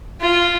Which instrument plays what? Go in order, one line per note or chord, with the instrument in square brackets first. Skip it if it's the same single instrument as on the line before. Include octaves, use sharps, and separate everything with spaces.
[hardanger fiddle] F4